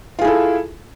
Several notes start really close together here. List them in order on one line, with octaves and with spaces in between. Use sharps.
F4 G#4 E4 A4